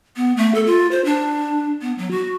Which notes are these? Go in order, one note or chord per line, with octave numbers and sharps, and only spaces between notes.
B3
A3
A4
F4
C5
D4
B3
F#3
F#4